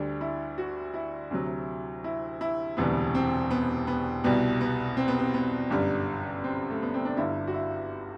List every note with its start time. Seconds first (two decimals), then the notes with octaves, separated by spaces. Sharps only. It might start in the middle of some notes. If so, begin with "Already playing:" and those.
Already playing: D2 D3 G3 D4
0.21 E4
0.58 F#4
0.94 E4
1.30 D2 C3 F#3
2.04 E4
2.41 E4
2.77 E1 D2 C3 E3 G3 B3
3.15 C4
3.51 B3
3.87 B3
4.24 C2 B2 G3 B3
4.61 B3
4.97 C4
5.08 B3
5.19 C4
5.34 B3
5.70 G1 F#2 D3 G3
6.44 C4
6.70 A3
6.82 B3
6.94 C4
7.05 D4
7.17 G1 G2 D3 G3 E4
7.47 F#4
7.54 E4